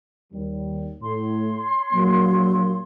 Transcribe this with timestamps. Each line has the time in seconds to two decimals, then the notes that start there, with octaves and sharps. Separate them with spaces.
0.33 D#2 G3
1.02 A2 C#5 C6
1.93 A#1 F#3 A#3